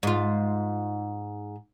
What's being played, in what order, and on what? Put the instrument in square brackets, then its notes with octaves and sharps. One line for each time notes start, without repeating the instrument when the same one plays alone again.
[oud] G#2 F4